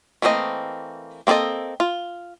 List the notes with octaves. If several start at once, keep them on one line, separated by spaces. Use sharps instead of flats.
E3 A3 A#3 C4 D#5
A#3 C4 D#4 A4 D#5
F4